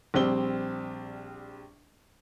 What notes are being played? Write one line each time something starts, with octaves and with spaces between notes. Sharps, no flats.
A#1 G3 C4 G7